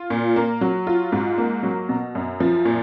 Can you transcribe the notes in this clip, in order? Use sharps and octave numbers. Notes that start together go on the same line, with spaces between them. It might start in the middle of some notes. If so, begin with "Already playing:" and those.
Already playing: F4
A#2
A#3
F#3
F4
G#2
A#3
F#3
B2
F#2
F3
A#2